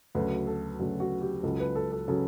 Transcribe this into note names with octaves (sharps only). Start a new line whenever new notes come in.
D2 C#3 F#3 B4
A4
D2 C#3 F#3 F#4
F#4
G4
C#2 C#3 F#3 A4
B4
A4
A4
C#3 F#3 A4